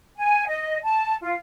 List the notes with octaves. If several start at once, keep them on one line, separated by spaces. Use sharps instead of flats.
G#5
D#5
A5
F4